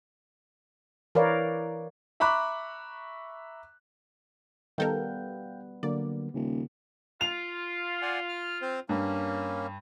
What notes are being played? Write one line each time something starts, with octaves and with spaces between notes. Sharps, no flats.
E3 A#4 B4 C#5 D5 F5
E5 A#5 B5 C#6 D6 F#6
D#3 G3 B3 A4 A#4 F5 G5 G6
D3 F#3 A#3 D5
D#1 C#3
F4 F7
D5 F#5 G#5
F6
C4 C5
G2 A#3 C#4